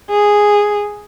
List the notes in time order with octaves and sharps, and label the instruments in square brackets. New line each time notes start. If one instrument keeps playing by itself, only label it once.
[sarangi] G#4